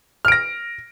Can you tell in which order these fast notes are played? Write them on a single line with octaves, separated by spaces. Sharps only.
F6 D7 A#6